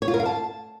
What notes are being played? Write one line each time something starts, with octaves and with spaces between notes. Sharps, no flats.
C#5
F4
A#4
F5
A5